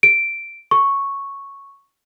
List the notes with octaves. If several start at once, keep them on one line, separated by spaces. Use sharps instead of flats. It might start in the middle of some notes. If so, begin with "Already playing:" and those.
D7
C#6